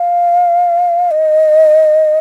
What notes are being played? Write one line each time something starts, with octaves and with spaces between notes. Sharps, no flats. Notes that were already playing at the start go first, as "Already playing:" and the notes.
Already playing: F5
D#5